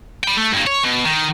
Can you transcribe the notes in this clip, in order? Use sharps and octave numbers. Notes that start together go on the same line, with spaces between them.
G5 B5
A3
G2 A#3
C#5
B2
D#3